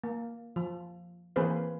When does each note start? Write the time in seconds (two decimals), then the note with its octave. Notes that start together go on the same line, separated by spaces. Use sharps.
0.04 A#3
0.56 F3
1.36 E3 A#3 C4 G#4 B4 C5